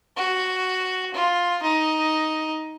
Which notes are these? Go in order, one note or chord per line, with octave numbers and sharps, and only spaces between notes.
F#4
F4
D#4